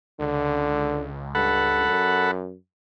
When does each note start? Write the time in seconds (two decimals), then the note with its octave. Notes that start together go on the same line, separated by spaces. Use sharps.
0.20 C#2 D3
1.35 G2 A4 F#5 B5
1.88 F#2